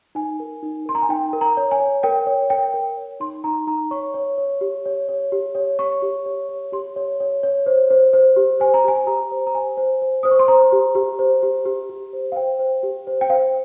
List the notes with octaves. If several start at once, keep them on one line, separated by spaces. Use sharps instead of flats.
D#4 G#5
A#4
D#4
A#4 C6
A#5
G#5
D#4 G5
A#4
A#5
C#5
G#5
C#5
A#4 G5
C#5
A#4 G5
A#4
C#5
D#4 C6
D#4 A#5
D#4 A#5
C#5 C#6
C#5
C#5
G4
C#5
C#5
G4
C#5
C#5 C#6
G4
C#5
C#5
G4 C6
C#5
C#5
C#5
C5
C5
C5
G4
C5 G#5
A#5
G4 G#5
G4 A#5
C5
A#5
C5 G#5
C5
C5
C5 D#6
C#6
C6
C5 A#5
G4
G4
C5
G4
G4
G4
C5
F5
C5 G5
C5
G4
C5
G5
C5 F5